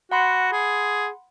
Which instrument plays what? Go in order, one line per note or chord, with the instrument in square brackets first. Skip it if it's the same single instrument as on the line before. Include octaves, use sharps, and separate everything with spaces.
[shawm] F#4 [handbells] F#5 B5 C6
[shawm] G#4